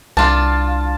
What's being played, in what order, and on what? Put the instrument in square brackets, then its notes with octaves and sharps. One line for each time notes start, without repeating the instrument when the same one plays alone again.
[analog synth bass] C2 [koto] D4 F4 [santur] A5